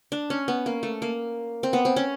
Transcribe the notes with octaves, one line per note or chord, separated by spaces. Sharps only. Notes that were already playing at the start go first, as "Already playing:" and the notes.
D4
C#4
B3
A#3
A3
A#3
C4
B3
C4
C#4